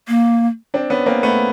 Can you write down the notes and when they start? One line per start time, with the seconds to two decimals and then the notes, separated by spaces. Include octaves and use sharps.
0.08 A#3
0.74 C4 D4
0.90 B3 C#4
1.06 A#3 C4
1.23 A3 B3